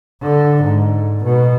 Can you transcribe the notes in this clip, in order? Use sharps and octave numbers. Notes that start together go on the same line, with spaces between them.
D3
G#2
B2